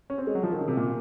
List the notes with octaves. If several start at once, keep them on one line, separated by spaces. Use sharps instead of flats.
C#4
C4
G#3
F#3
F3
D#3
C#3
C3
A#2